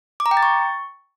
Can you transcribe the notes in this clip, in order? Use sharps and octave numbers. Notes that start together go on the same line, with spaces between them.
D6
A#5
G5
A6
C#6